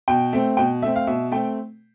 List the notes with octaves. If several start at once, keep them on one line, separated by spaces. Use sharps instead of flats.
B2 G5
A3 C4
B2 G5
A3 C4 E5
F5
B2 E5
A3 C4 G5